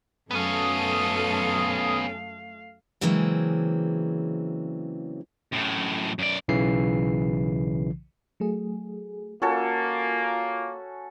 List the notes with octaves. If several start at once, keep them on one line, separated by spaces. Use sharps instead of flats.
F#2 A3 B3 C#4 A4 F5 D#6
C#3 E3 F#3 G#3 A#3 C4
F#2 A2
F#2 D5
B1 C#3 E3 C7
F#3 A3 G#4
A#3 C#4 F4 F#4 A4